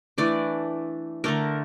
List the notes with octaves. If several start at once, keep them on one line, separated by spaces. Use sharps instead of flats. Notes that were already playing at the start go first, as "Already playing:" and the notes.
E3 A3 D4 D5
D3 A3 D4 A#4